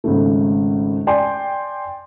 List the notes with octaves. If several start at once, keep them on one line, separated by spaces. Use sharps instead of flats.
G#1 C#3 A3
D5 G5 G#5 C6